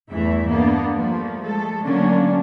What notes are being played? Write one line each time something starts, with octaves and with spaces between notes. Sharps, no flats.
E2 G2 E3 A3 E5
A#3 B3 D4
F3 G3 A3 A#3
G#3 A3 A4
D3 F#3 A3 A#3 C#4 D4